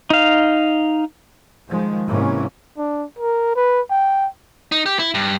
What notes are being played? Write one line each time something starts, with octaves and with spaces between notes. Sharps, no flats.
D#4 F5
D#3 F3 G#3
G#2 C3 E3 A#3 C#4
D4
A#4
B4
G5
D#4
G4
E4
G2